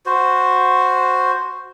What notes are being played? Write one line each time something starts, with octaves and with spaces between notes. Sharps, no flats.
F#4 C5